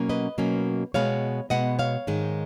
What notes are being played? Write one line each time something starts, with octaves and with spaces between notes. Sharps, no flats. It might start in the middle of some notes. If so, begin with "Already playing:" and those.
Already playing: B2 F#3 A#3 C#4
B4 D#5
B2 F#3 A#3 C#4
B2 G#3 B3 C#5 F5
B2 G#3 B3 D#5 F#5
C#5 F5
G#2 D#3 G#3